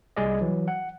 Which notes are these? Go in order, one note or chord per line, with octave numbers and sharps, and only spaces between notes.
C2 G3 G#4 D5 D#5
E3 F#3
F#5